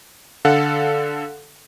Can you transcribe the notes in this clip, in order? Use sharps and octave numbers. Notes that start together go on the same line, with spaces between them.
D3 A4 F5 F#5